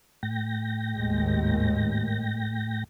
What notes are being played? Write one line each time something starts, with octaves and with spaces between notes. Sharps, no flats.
A2 G5 A#6
G#1 D#2 G#3